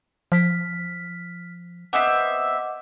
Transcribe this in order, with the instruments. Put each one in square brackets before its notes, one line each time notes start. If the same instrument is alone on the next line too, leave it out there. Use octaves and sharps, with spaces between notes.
[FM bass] F3 [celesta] F6 B6
[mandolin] B3 C4 E5 [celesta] D#5 F#5 D6